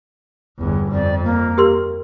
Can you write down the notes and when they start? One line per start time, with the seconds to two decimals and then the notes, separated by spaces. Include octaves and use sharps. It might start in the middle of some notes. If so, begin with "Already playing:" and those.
0.58 G1 E2
0.92 F2 D5
1.24 A#3
1.58 G4 A#4 C6